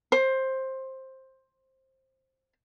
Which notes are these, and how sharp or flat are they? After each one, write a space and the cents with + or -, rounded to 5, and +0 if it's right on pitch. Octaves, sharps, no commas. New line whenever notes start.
C5 +15